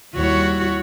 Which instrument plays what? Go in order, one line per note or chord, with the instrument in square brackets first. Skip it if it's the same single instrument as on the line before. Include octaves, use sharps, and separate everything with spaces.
[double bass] D#2 G3 [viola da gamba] E4 F#4 C#5